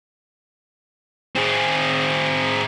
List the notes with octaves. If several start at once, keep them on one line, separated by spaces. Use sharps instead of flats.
C4 G#4